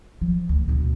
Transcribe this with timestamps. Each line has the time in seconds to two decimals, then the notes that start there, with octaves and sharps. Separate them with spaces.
0.21 F3
0.49 D2
0.68 D2 B2